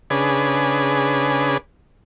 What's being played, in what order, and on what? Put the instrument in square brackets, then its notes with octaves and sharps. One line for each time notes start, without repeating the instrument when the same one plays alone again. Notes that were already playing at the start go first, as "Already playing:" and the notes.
[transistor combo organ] C#3 D4 G#4 B4